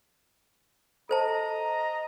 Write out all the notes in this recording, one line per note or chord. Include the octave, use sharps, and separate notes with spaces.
A4 C5 D#5 A5 A#5